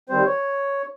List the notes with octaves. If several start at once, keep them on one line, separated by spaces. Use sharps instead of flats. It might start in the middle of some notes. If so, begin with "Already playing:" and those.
D#3 G3 C4 C5
C#5